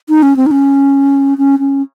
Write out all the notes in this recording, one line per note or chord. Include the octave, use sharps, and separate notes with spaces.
D#4
C#4
C4
D#4
C#4
C#4
C#4